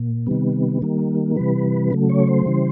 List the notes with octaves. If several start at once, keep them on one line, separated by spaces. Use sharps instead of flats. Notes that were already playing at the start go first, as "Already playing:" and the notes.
Already playing: A#2
C3 D#3 G3 B3
D#3 G3 A#3
C3 E3 G3 B4
C#3 F#3 A3
C#5
C5
C#3 E3 G3